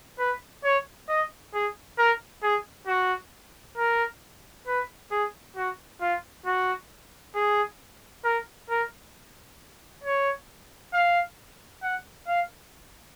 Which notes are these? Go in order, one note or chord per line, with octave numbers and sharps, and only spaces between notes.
B4
C#5
D#5
G#4
A#4
G#4
F#4
A#4
B4
G#4
F#4
F4
F#4
G#4
A#4
A#4
C#5
F5
F#5
F5